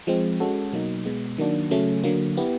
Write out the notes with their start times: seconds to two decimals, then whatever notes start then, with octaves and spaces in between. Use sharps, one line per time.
0.07 F3 G#3 C4
0.40 G#3 C#4 F#4 A4
0.73 B2 F#3 A#3 D#4
1.05 B2 G#3 B3
1.38 D#3 F#3 A#3 D4 F#4
1.71 C#3 F#3 A3 C#4
2.04 D3 F#3 A#3
2.37 B3 E4 G4